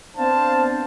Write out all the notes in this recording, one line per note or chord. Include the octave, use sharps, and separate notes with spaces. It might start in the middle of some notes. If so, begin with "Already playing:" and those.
B3 C4 D4 C5 F5 A5